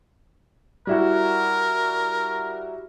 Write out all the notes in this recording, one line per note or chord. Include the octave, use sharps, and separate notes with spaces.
G3 E4 F#4 A#4